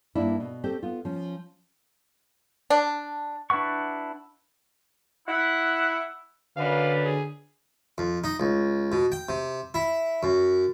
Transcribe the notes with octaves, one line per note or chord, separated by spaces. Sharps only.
G2 A#3 D4 E4
B2
A3 C4 G4
B3 F4
F3 C#4
D4
D4 E4 B4 F#5 C#6
E4 F#5
F#2 D3 B4 D5 F5
G#4
F2
D#4
C#2
B2
G5
C3
E4
F#2